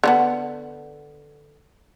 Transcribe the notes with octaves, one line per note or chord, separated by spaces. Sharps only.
D3 F#3 B3